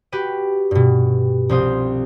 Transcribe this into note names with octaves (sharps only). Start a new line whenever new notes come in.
F#4 G4 B4 D#7
G2 B2
C2 F3 C4 C5 D#6